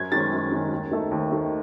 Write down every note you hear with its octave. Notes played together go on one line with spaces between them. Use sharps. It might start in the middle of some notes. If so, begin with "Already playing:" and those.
Already playing: F#2 G#6
D#3 G#3 C#4 A6
F#2
D#3 G#3 C#4
D#2
D#3 A3
D#2
D#3 A3